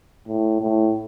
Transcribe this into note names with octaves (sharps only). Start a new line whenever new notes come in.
A2
A2